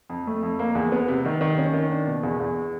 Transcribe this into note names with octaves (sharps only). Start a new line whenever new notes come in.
F2
A3
F2
A#3
E2
B3
C3
D#3
D#3
C#4
D#3
D4
B2
E2
E2